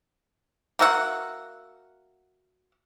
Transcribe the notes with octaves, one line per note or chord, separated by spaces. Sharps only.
A#3 F#4 E5 F#5